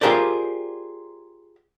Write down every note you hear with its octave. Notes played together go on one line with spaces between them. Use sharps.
F4 G4 G#4 A#4 C5 D5